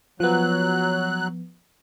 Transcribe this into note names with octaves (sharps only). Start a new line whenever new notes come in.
F3 F#3 B3 F#6